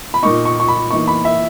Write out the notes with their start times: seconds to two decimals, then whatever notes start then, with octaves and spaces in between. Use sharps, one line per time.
0.14 B5
0.23 A#2 A#3 D#4 C#6
0.45 C#6
0.60 C#6
0.68 B5
0.91 E3 A#3 D#4 C#6
1.08 B5
1.25 E5